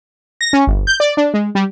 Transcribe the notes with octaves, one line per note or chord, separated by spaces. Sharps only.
A#6
C#4
G1
G6
D5
D4
G#3
G3